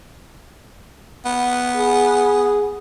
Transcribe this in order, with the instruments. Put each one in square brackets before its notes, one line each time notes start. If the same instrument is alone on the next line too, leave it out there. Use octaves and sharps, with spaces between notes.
[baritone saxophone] B3
[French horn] G#4